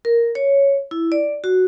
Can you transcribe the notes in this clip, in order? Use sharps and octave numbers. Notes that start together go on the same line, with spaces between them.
A#4
C#5
E4
D5
F#4